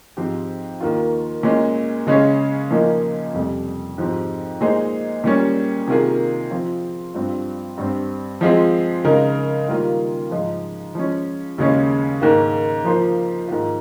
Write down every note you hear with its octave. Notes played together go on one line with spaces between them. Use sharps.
G#2 F3 C4 G4 C5
D#2 D#3 A#3 F4
A#2 G#3 C#4
C#3 G#3 C#4
A#2 F3 A#3 D#4
F2 C3 G3
G#2 F3 C4 G4
A#2 G#3 D#4 G#4 C5
A#2 G3 C#4
C3 D#3 A#3 F4 G#4
F3 C4 F4
G2 G3 C4 F4
G2 G3 C4
F3 G#3 C4 F4 G#4
C#3 G#3 D#4 A#4
D#3 G3 A#3 F4
G#2 F3 G#3 D#4
F3 G#3 C#4
D#2 C#3 G#3 C#4
G#2 D#3 A#3
F3 A#3 F4 C5
G#2 D#3 A#3 F4